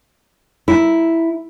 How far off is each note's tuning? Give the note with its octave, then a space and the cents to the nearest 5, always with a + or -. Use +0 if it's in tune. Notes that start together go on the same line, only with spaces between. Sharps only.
E4 +0 A#4 +15